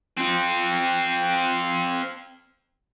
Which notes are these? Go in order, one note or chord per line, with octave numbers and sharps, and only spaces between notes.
C4 F4